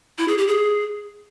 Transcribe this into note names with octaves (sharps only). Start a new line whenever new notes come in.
E4
G#4
G4
G#4